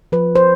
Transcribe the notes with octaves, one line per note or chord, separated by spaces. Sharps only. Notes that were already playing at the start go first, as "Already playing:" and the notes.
F3 B4
C5